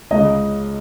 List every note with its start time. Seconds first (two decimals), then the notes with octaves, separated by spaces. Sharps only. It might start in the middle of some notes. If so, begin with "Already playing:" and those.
0.11 C#2 C#3 D#5